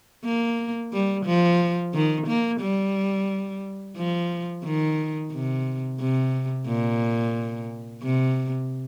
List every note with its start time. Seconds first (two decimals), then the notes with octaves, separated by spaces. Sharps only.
0.25 A#3
0.93 G3
1.26 F3
1.94 D#3
2.27 A#3
2.61 G3
3.97 F3
4.65 D#3
5.32 C3
6.00 C3
6.67 A#2
8.03 C3